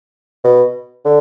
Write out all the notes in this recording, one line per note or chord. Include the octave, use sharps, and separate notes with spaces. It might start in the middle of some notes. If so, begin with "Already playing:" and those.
B2
D3